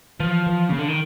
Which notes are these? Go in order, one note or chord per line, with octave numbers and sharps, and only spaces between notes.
E3 F3
E3
C#3 A#3
D3
D#3